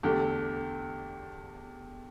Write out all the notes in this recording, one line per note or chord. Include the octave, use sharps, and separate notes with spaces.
E2 D3 A3 G4